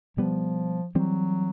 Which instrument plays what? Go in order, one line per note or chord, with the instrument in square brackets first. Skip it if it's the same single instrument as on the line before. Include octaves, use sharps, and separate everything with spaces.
[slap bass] B2 G3 B3 [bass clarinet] F3
[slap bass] E3 G3 C4 [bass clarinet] F#3